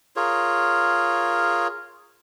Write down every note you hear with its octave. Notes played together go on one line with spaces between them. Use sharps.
F4 G#4 A#4 C#5